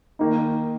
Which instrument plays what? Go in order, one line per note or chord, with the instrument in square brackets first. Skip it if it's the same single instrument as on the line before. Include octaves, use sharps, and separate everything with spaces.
[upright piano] D#3 A#3 D#4